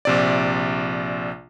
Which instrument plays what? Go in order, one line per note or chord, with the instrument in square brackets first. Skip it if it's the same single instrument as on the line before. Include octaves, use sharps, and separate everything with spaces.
[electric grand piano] A#1 C3 D5